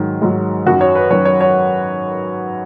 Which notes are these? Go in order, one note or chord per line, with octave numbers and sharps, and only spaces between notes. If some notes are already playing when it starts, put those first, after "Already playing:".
Already playing: G#2 D#3 F#3
G#2 D#3 F#3
F#2 D#3 F#3 F#4
C#5
B4
F#2 D#3 F#3 C#5
C#5
C#5